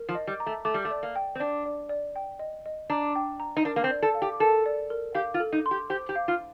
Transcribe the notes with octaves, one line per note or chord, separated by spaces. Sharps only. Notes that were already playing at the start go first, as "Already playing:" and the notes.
Already playing: A#4
F3
D#5
G3
A#5
A3
A3 D6
G3
A3
D5
A#3
G5
C4
D4 D5
D5
D5
G5
D#5
D#5
D4 A#5
G5
A#5
D#4
D4 A#4
A#3
C4
D5
A4
F5
G4
A4 A#4
D5
A#4
G4 F5
F4
A4
D#4
C6
G4
G4 C5
G4
F5
F4